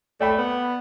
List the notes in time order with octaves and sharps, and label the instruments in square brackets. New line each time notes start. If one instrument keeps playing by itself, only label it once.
[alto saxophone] A3 [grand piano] D5 G5 B5
[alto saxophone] B3